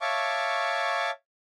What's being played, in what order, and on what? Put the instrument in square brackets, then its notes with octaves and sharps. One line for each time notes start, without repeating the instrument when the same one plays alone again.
[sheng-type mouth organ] C#5 E5 F5 A5 C#6 D6